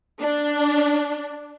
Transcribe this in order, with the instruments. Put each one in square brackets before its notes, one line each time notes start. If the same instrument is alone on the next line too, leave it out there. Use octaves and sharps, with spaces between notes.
[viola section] D4